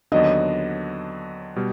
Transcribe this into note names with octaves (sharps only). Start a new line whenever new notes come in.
D#2 D3 F#3 B3 D4 D#5
B2 G3